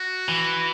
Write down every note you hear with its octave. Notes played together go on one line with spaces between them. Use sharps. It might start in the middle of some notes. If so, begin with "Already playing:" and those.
Already playing: F#4
E3